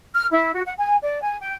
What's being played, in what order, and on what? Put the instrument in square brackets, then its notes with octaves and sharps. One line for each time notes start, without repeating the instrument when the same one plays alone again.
[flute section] F6
E4
F#4
F#5
G#5
D5
G#5
G5